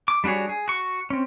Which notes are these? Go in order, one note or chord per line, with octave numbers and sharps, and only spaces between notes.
D6
G3 D4 F#4 G#4 C#5
G#4
F#4 C#6
C4 C#4